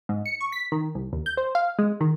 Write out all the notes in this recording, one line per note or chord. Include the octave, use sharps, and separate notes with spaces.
G#2
C#7
C#6
B6
D#3
C2
D#2
G6
C5
F5
G#3
D#3